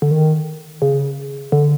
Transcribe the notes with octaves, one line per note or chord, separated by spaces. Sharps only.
D3
D#3
C#3
D3